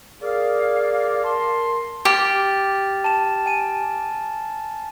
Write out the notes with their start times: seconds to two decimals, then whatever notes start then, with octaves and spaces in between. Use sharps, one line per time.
0.22 G#4 A#4 D5 F5
1.24 A#4 A5 C6
2.05 G4 F6 A6
3.04 A5 E7
3.46 G#5 D#7